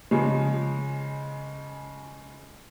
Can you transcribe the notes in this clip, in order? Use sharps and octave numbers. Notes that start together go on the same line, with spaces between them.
C#3 F3 G#3